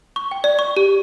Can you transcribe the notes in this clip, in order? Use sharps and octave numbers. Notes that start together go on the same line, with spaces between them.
C#6
G5
D5
C#6
G4